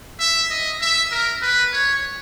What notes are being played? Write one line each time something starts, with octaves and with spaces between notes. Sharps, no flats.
E5
D#5
E5
A#4
B4
C#5